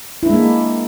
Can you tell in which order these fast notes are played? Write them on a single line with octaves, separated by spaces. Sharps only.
E4 D4 G#3 A#3